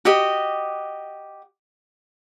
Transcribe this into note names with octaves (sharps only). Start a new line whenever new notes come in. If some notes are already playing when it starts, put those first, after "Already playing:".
F#4 G4 D#5